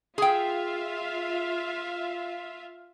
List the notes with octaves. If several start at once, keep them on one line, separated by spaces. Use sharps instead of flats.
F4 G#4 E5 F5 G5